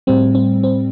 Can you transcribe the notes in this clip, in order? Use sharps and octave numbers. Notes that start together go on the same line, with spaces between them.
A2 G3 C4
C4
C4